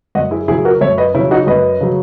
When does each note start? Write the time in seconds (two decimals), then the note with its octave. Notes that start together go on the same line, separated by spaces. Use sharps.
0.15 F#2 D#5 F#5
0.31 E4 G#4
0.48 C#3 F#3 E4 G#4
0.65 F#4 A#4
0.81 F#2 C#5 E5
0.98 B4 D#5
1.14 C#3 C#4 E4
1.19 F#3
1.31 D#4 F#4
1.47 F#2 B4 D#5
1.81 C#3 F#3